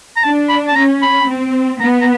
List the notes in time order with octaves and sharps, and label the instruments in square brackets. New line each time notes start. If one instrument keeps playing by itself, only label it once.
[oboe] A#5
[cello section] D4 [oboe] A5
[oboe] B5
A5
[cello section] C#4 [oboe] A#5
[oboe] B5
[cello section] C4
[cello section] B3 [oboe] A#5
[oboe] A#5